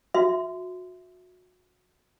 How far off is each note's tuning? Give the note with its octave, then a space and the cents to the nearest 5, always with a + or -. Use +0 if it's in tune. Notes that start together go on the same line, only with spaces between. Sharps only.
F#4 -30 E5 +0 C6 -25